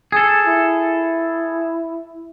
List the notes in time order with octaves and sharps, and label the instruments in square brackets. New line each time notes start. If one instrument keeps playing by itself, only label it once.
[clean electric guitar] G#4 A4
[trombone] E4